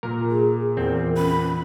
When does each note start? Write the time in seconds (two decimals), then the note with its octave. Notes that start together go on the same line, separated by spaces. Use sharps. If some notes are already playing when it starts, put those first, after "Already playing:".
0.03 A#2 A#4
0.30 G#4
0.77 E2 C4 A#4
1.17 C#4 B5